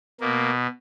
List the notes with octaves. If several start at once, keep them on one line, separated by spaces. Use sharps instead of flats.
B2 A#3